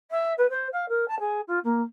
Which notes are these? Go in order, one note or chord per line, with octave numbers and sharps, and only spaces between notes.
E5
B4
C5
F5
A#4
A5
G#4
F4
A#3